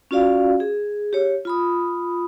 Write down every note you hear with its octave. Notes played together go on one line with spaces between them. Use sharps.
C#4 F4 F#4 D5 F5
G#4
G4 C#5
F4 B5 D#6